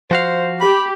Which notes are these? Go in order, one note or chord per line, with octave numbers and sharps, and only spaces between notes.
F3 F#4 C5 F5
G4 B5